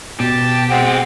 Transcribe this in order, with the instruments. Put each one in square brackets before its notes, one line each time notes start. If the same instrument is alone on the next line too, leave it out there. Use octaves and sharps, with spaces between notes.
[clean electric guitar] B2 [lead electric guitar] G4 [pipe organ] A5
[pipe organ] G#3 C4 [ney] F#5